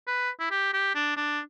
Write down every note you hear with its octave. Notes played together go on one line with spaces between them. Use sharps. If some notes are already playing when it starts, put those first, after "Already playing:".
B4
E4
G4
G4
D4
D4